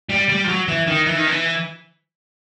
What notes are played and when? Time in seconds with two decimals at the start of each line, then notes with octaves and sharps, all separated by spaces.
0.09 G3
0.28 G3
0.44 F3
0.48 F#3
0.68 E3
0.87 D#3
1.06 E3
1.17 D#3
1.28 E3